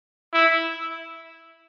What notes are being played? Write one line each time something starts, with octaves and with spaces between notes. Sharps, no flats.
E4